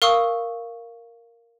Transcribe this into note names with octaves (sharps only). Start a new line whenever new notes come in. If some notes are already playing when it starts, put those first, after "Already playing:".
A#4 F5 C#6 D#6 E6